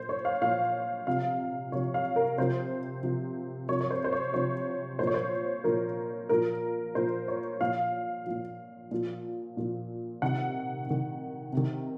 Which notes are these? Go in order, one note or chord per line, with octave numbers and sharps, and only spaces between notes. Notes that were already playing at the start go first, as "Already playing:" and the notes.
Already playing: A#2 C5
C#5
F5
A#2 F3 F5
C3 F3 F5
C3 F3 C#5
F5
A#4
C3 F3 C5
C3 F3
C3 F3 C#5
C#5
C5
C5
C#5
C3 F3 C#5
A#2 F3 C5
C#5
C5
A#2 F3 A#4
A#2 F3 A#4
A#2 F3 C5
C#5
A#2 F3 F5
A#2 F3
A#2 F3
A#2 F3
C3 D#3 F#5
C3 D#3
C3 D#3